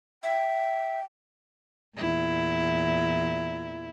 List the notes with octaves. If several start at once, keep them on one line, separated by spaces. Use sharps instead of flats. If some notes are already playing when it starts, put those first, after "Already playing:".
E5 G5
E2 A#2 E4